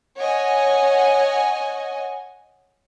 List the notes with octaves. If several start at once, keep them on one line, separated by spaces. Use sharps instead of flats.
C#5 D#5 F#5 G#5